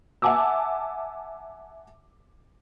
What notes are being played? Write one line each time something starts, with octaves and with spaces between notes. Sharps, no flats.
E5 F#5 G#5 A5 D6 E6